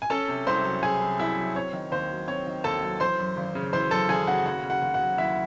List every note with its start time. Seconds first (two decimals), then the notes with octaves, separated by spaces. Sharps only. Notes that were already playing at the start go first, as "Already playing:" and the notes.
0.02 G#5
0.10 C#4 A4 A5
0.28 C3
0.47 C2 C5 C6
0.65 F#3
0.83 C#4 G#4 G#5
1.01 C3
1.19 C2 E4 E5
1.37 F#3
1.55 C4 C#5
1.73 D#3
1.92 D#2 C5
2.10 F#3
2.28 C4 C#5
2.47 D#3
2.64 D#2 A4 A5
2.83 F#3
3.00 E3 C5 C6
3.19 F#2
3.37 G#1
3.55 C#3
3.73 E3 C5 C6
3.91 F#2 A4 A5
4.09 G#1 G#4 G#5
4.27 C#3 F#4 F#5
4.46 D#2 F#4 F#5
4.63 C#3
4.70 F#4 F#5
4.82 D#2
4.94 F#4 F#5
5.00 F#3
5.18 D#2 E4 E5